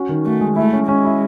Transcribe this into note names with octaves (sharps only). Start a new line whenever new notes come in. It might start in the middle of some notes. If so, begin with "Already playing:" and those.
Already playing: C#4 F#4
D#3
A3 F#4
G#3
A3 E4
C#4
G#3 C#4
E4